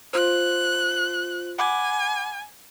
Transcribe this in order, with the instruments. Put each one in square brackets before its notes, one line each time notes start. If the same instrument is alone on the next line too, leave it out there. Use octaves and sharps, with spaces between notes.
[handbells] F4 C5 [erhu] F#6
[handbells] F#5 B5 D6 [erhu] G#5